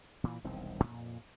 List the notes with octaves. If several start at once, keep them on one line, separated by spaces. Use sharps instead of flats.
A#2 E3
E1 C2 D#3 C4
F2 A#2